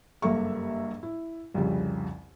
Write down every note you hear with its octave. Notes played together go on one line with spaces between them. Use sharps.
F#1 G2 A#3 A4 E5 C#6
E4
C2 F2 C#3 G3